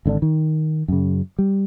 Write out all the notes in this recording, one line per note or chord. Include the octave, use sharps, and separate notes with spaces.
G#1 D3 C#4 D4
D#3
F#2 C#3
G3